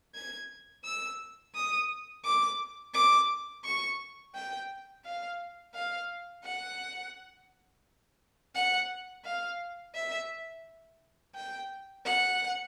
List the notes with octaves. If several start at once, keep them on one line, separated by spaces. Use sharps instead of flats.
G#6
E6
D#6
D6
D6
C#6
G5
F5
F5
F#5
F#5
F5
E5
G5
F#5